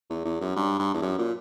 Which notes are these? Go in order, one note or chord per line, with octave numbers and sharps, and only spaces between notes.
E2
E2
F#2
G2
G2
E2
F#2
A#2